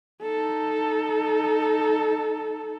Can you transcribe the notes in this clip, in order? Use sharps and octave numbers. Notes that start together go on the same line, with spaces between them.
D#4 A4